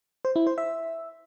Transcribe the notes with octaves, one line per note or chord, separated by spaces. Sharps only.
C5
E4
C5
E5